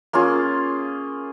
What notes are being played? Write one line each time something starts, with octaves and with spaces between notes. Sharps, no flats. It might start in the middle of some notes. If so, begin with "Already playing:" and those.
A#3 C#4 F4 G#4